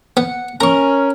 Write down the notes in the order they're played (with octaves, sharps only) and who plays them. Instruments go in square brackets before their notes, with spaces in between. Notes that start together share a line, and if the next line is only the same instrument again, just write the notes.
[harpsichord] B3 [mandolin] F#5
[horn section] C#4 [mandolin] A#4 [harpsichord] A#5 C#6